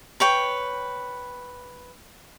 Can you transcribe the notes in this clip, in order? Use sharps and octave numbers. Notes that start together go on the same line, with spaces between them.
B4 C#5 G5